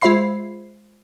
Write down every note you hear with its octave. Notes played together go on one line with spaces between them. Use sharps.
G#3 F4 C5 E5 B5 C7